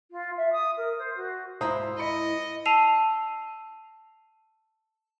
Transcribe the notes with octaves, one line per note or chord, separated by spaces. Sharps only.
F4
E5
D#6
A#4
C5
F#4
G#2 E4 F4 C5 A#5 D#6
D#5 B5 C#7
A5 E6 C7 D#7 F7